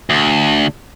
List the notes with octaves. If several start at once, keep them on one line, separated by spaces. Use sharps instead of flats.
D2